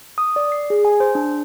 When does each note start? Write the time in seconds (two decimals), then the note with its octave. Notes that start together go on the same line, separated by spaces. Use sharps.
0.18 D#6
0.36 D5
0.52 C7
0.70 G#4
0.85 G#5
1.00 C5
1.15 D4